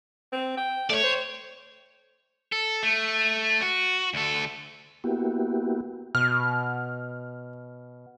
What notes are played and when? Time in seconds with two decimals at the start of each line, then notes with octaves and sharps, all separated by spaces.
0.32 C4
0.57 G5
0.90 A3 C#5 D5
1.03 C5
2.52 A4
2.83 A3
3.62 F#4
4.14 D2 A4
5.04 A#3 B3 E4 F#4 G4
6.15 B2 F6